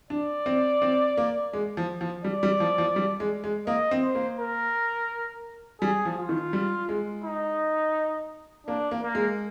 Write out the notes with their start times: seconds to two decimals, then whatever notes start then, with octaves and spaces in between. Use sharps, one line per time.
0.10 D4 D5
0.46 C4
0.82 C4
1.17 A#3
1.53 G#3
1.77 F3
2.01 F3
2.24 G3 D5
2.43 G3
2.60 F3
2.78 F3
2.96 G3
3.20 G#3
3.44 G#3
3.67 A#3 D#5
3.91 C4
4.03 C5
4.15 A#3
4.39 A#4
5.81 G3 G#4
6.05 F3
6.17 F4
6.29 D#3
6.53 G3
6.89 G#3
7.24 D#4
8.67 A#3 D4
8.91 A#3
9.03 A#3
9.15 G#3